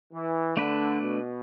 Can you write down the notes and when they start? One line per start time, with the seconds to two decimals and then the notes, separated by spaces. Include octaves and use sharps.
0.13 E3
0.57 D3 A3 D4 B4
1.01 B2